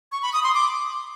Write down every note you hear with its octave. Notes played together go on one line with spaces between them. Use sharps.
C#6
B5
D#6
C6
D6